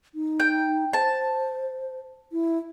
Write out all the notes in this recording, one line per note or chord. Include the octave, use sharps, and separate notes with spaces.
D#4
G5
C5 A5
E4